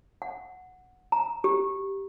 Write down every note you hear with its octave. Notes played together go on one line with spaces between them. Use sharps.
F#5
A#5
G4